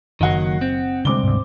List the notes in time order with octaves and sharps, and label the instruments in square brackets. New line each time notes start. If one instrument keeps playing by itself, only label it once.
[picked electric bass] F#1 [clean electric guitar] D#3 F#3 A#3 [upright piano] D#5 F#5
[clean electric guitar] C4
[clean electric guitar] C2 [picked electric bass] D3 G#3 [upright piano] C4 D6 G7
[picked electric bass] D2 G#2